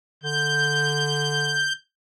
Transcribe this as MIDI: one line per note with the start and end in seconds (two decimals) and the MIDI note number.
0.23 1.71 50
0.23 1.73 91